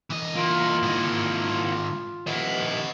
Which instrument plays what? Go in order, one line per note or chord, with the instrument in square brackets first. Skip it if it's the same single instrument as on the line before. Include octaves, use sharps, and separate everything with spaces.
[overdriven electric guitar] E3 D#5
[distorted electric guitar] A#3 E4 [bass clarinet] F4
[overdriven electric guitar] G#2 D#3
[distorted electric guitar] D#3 E4 [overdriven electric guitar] D#5 F#5